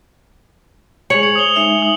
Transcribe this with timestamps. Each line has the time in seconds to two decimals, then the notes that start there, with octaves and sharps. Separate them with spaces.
1.10 G#3 G#4 C#5 C#6 F7 F#7
1.23 C5 C#7
1.36 D#6 F7 G7
1.56 G#3 D#4 E5
1.79 D#6 F#7